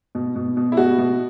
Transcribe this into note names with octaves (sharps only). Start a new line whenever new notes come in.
B2
B2
B2
E4
B2 F#4
B2